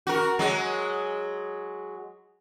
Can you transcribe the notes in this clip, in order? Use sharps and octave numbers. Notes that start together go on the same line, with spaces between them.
F#4 A#4
F#3 G#3